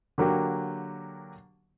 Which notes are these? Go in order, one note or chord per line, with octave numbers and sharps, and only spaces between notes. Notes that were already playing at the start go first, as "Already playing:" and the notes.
D3 F#3 A#3 G4